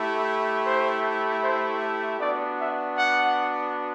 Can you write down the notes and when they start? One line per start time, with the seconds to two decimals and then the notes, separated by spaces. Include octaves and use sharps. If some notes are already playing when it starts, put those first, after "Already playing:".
Already playing: A3 E4 G4
0.64 C5
1.41 C5
2.20 B3 D4 F#4 D5
2.58 E5
2.98 F#5